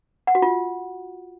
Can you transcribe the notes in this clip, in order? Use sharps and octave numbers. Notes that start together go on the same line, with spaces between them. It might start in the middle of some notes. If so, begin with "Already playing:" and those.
F#5
F#4
F4